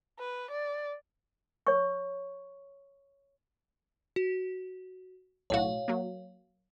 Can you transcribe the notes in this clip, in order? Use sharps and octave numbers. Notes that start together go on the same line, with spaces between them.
B4
D5
C#5 C#6
F#4
B1 A2 F#4 C#5 F5
F#3 A#3